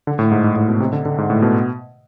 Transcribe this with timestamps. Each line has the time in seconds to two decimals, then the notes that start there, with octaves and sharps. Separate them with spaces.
0.07 D3
0.19 A2
0.31 G#2
0.44 G#2
0.56 A2
0.68 B2
0.80 C3
0.93 D3
1.05 D3
1.18 G#2
1.30 A2
1.42 B2